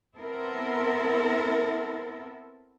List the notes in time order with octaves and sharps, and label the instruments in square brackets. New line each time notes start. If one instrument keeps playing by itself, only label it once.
[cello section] B3 C4 E4 A4 A#4